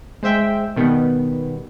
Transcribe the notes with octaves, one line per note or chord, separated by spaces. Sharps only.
G#3 C5 E5 G5
B2 D#3 G3 B3